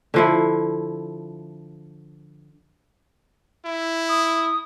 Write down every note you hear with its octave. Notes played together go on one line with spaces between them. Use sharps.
D3 F3 E4
E4
D#6